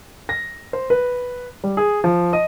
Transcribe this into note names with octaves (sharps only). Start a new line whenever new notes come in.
A#6
C5
B4
G3
G#4
F3
D#5